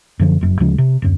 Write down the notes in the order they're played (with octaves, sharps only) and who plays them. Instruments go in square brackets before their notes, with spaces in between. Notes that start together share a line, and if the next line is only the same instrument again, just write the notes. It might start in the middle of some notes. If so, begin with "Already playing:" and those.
[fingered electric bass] F#2 D3 F3
F1 F#2
D2 C#3 F3 G#3
C3
D1 F#2